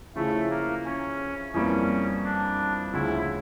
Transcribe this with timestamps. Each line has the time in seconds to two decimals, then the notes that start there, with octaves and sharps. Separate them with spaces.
0.15 C#3 F3 A3 C#4 E4
0.50 A#3
0.85 C#4
1.54 F2 E3 G3 A#3 C#4
2.24 D4
2.93 D2 C#3 F3 C#4 E4